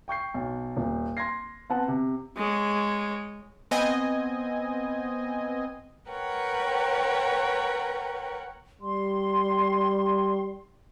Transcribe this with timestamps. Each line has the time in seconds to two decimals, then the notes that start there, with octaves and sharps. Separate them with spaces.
0.08 G5 C#6 G6 C7
0.34 B1
0.77 D#1
1.17 C6 G#6 A#6 C7
1.70 B3 C4 F#5 A5
1.88 C3
2.36 G#3 C#5
3.71 B3 C4 D#5 G#5
6.09 A#4 B4 C#5 F#5 G5
8.81 G3 C6